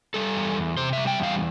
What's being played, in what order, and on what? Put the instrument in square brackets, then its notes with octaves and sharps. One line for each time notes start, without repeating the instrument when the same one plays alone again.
[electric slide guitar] G3 A4
E2
E2
C3 C5
G3 E5
G5
E2
F5